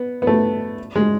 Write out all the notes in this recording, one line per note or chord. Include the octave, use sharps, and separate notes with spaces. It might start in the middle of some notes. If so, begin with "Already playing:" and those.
Already playing: B3
B3
A3
G#3